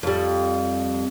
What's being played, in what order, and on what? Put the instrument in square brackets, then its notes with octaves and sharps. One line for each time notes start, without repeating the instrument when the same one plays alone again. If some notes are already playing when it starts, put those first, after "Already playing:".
[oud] F2 G3